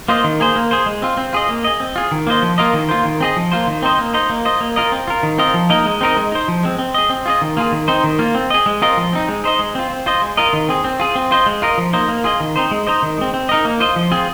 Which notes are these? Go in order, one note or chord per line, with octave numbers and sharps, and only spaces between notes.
A#3 F4 C5 D#5
D#3
A#3 G#4 C5
A#3
G#4 C5
G#3
C4 F4
C4
F4 G#4 D#5
A#3
G#4 D#5
C4
F4 G#4
D#3
A#3 F4 C5 D#5
F3
A#3 F4 A#4 D#5
D#3
A#3 F4 C5
D#3
C4 G#4 D#5
F3
A#3 F4 C5
D#3
C4 D#4 C5 D#5
A#3
D#4 C5 D#5
A#3
F4 C5 D#5
A#3
F4 A#4 D#5
C4
F4 A#4
D#3
C4 F4 A#4 D#5
F3
A#3 D#4 A#4 D#5
G#3
C4 D#4 A#4 D#5
G#3
D#4 C5
F3
G#3 C4
C4
G#4 D#5
C4
F4 G#4 D#5
D#3
A#3 F4 G#4
D#3
C4 D#4 C5
D#3
A#3 F4
C4
G#4 D#5
G#3
C4 F4 A#4 D#5
F3
C4 D#4
G#3
D#4 C5 D#5
G#3
C4 F4
C4
F4 C5 D#5
G#3
F4 A#4 D#5
D#3
C4 G#4
C4
F4 G#4
C4
F4 C5 D#5
G#3
F4 A#4 D#5
F3
A#3 D#4 C5 D#5
A#3
F4 G#4 D#5
D#3
C4 D#4 C5
G#3
D#4 C5 D#5
D#3
G#3 C4
C4
D#4 A#4 D#5
A#3
F4 C5 D#5
F3
C4 F4 G#4